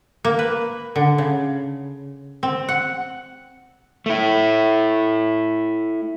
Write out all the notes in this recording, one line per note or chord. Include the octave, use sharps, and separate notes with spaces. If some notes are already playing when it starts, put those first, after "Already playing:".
A#3
B4
D3
C#3
C4
F#5
A3 E4